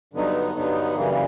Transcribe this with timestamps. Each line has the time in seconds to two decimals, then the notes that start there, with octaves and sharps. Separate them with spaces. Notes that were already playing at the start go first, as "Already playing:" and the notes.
0.13 G2 D3 F#3 B3 D#4
0.55 G2 D3 F#3 B3 D#4
0.95 F#2 C#3 E3 G3 A#3